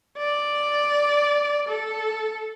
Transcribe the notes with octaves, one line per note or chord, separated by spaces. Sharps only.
D5
A4